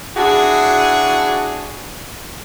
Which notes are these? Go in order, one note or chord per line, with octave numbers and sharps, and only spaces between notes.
D4 E4 F#4 G#4